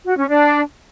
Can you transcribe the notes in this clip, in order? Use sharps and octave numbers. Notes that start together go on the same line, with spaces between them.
F#4
C#4
D4